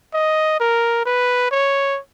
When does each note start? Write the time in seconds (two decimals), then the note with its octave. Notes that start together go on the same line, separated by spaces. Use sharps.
0.14 D#5
0.60 A#4
1.06 B4
1.51 C#5